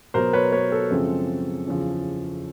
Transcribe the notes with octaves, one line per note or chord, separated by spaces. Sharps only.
B2 F#3 B3 A#4 C5
B4 C#5
B4 C#5
A4
F#2 C#3 F3 G#3 C4
E2 C#3 F3